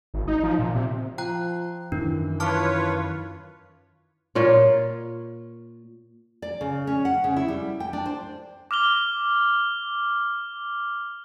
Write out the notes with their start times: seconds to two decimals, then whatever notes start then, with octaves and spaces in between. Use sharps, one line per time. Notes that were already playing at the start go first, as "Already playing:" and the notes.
0.14 G#1
0.28 D#4
0.43 F3
0.59 A#2
0.75 C3
1.18 F3 G5 A#5 F#6
1.92 F#2 D#3 E3 D4
2.40 F4 B4 C#5 A5 D6 F6
4.35 A#2 F4 C#5
6.42 D5
6.61 C#3
6.87 C#4
7.05 F#5
7.24 C#3
7.36 E4
7.48 G3
7.80 G5
7.93 D4
8.06 C5
8.71 D6 F6 F7 G7